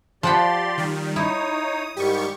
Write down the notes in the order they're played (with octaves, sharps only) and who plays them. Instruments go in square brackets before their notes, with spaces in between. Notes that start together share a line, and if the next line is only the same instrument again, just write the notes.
[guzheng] F3 F#5 B5 [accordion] G4 D5 C6
[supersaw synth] D#3 G3
[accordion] D#4 C#5 [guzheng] E4 [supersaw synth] D#6
[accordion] G#2 D#3 G3 [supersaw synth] G4 C#6